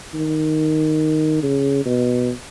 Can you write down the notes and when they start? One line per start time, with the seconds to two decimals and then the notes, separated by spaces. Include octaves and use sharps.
0.14 D#3
1.43 C#3
1.85 B2